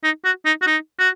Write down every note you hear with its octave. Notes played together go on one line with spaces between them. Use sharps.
D#4
F#4
D#4
F#4
D#4
F#4